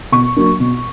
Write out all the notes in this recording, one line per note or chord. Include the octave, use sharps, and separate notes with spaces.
B2 C#6
F#3 A#3 D4
B2